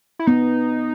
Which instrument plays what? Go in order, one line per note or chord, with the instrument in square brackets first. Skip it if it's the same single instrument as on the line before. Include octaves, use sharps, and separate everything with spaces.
[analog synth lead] E4
[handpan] B3 [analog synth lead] D#4